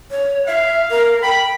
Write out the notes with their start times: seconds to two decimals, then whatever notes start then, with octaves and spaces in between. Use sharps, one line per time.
0.11 C#5
0.47 E5 F5
0.91 A#4
1.23 G5 B5